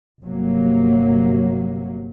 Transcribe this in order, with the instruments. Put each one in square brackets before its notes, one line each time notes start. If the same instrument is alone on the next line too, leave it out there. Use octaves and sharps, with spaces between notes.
[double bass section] G1 C3 F#3 A#3